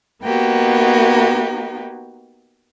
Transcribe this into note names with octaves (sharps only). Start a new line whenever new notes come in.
A#3 B3 D#4 F#4 G4